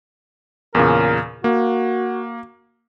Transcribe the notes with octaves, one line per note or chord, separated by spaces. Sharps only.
E2 A#2 C#3 A#4
A#3 F#4